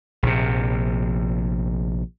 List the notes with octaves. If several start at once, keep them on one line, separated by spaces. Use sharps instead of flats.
A#1 C3